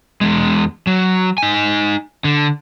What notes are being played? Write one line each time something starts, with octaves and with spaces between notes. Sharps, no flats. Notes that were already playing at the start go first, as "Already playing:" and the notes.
E2 G#3
F#3
D#4 G#5
D3